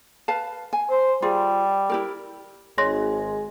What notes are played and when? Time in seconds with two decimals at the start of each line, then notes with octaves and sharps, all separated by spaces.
0.28 B4 F5 A5
0.73 G#5
0.90 C5
1.22 G3 F4 G#4
1.90 E4 G4 A#4
2.78 G#1 G#3 C#5 C6 A#6